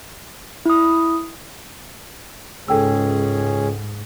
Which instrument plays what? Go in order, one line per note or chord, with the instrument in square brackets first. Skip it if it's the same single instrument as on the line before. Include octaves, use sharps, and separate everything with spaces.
[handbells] E4 D#6
[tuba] C#2 [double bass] G#2 [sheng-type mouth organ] C#4 G#4 [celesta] A4 G5 E6